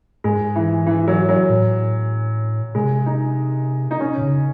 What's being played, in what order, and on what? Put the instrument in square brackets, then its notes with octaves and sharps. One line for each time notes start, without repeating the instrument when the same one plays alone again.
[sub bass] G#2 [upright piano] G#3
[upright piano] E3
E3
F#3
F#3
[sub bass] A2
[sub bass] C3 [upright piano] G#3
[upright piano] D#4
D#4
C#4
[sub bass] C3
C#3